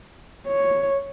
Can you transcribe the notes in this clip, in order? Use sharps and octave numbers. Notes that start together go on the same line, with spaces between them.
C#5